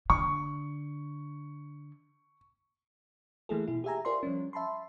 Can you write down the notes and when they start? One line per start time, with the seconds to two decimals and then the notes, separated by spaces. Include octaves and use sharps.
0.10 D3 C#6
3.49 E3 A3 A#3 E4 G#4 A4
3.68 B2 E4
3.84 G4 G#4 E5 G#5 A#5
4.05 F4 A#4 C5 D5 E5 C6
4.23 F3 G3 C#4
4.53 E5 A5 B5 C6